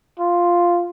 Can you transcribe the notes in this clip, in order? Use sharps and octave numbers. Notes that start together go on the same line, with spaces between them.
F4